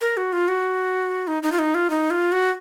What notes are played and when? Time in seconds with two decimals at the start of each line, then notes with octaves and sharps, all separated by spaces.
0.01 A#4
0.17 F#4
0.33 F4
0.48 F#4
1.27 D#4
1.43 D#4
1.52 F4
1.59 D#4
1.75 F4
1.90 D#4
2.10 F4
2.32 F#4